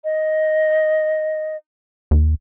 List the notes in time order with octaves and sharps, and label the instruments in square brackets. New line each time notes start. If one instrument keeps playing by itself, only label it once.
[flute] D#5
[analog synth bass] D#2